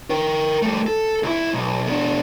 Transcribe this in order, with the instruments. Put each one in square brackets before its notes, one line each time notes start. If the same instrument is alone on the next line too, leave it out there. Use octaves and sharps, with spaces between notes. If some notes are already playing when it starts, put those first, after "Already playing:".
[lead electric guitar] A#4 G5
G3 A3
A4
C#2 E4
B1
B2 D4